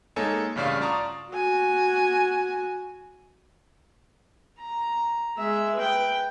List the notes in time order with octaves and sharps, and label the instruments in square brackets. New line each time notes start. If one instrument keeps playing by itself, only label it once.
[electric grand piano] G#3 A#3 D#4 A4 C#5 G#5
A1 G2 C#3 D5 F5 C#6
F4 D5 A5 A#5 C#6 D#6
[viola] F#4 G#5
[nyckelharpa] A#5
G#3 E5
B4 G5